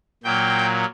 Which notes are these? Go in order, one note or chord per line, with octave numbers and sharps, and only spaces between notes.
A#2 F#3 A#3 G5